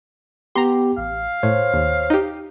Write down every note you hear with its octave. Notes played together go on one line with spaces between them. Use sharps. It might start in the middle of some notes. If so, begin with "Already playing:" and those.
B3 G4 A#5 C6
A1 F5
A2 C5 C#5
D#2
D#4 G4